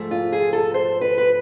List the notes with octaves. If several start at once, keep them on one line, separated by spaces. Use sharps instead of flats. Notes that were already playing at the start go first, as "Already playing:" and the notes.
Already playing: G#2 F3 A3
F4
G#4
A4
C5
B4
B4